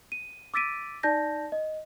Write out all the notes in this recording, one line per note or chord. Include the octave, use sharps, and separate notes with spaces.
D#7
D6 E6 A6 B6 D7 D#7
D#4 D5 A5 G6 A#6
D#5